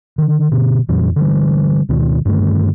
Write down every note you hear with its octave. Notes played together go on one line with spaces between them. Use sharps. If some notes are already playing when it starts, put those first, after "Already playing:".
D3 D#3
B2 D3
F2 A#2 E3 F#3
D3 E3 G3
D2 B2 D#3
G2 D3 D#3 A3